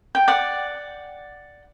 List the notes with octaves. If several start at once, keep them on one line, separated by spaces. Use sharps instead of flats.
G5
D5 F#5